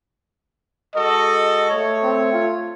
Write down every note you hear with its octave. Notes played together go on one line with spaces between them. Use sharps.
G#3 F#4 A4 D#5
A3 C#5
C4
F4